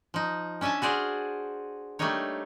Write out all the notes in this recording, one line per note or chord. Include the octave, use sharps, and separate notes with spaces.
F3 D#4
C#4 D4 E5 G#5 A5
F#4 G#4 C5 D5 F5
G3 A3 A#3 D4 D#4 C#5